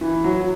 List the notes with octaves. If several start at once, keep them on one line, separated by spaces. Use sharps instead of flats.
E3
F#3
F#3